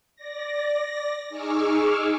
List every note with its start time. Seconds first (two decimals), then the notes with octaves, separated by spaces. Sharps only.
0.16 D5 A#6
1.29 D#4 G#4 C#6 D6 E6 F6